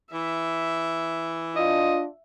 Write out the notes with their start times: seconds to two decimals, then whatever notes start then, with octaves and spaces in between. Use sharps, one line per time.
0.13 E3 E5
1.56 D4 F4 D#5